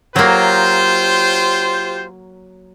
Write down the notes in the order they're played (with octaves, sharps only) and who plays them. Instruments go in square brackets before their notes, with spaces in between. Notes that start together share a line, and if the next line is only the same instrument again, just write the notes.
[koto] F#3 A#3 [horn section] F4 G4 C5